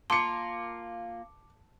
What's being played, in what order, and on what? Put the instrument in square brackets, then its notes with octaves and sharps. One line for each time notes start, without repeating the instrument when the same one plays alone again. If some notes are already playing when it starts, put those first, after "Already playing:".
[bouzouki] A#3 F4 [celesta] A5 [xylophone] C6 [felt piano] D6 C#7